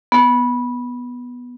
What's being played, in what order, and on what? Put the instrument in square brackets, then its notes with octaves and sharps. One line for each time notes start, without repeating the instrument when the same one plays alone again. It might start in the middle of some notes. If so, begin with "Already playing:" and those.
[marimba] B3